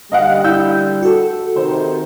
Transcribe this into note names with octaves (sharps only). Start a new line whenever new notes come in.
D3 G3 D#5 F5 F#5
E4 E6 G6
F#4 A4
C3 D#3 C5